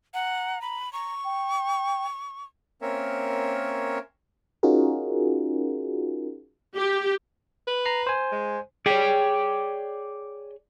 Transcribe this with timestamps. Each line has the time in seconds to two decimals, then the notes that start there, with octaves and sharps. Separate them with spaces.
0.14 F#5 A#5
0.62 B5
0.93 A#5 C#6
1.24 G5
2.82 A#3 C4 C#4 A#4 C#5 E5
4.63 C#4 D#4 F4 F#4 G#4 A#4
6.77 G4
7.67 B4
7.85 A#5 C7
8.07 C5 G#5
8.32 G#3
8.86 G#4 C#5 D5 G5